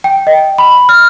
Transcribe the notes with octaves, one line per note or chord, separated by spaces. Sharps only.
G5
D#5
B5
F6